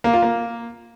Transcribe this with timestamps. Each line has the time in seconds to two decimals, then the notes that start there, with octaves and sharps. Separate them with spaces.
0.04 A#3
0.13 F4
0.22 A#3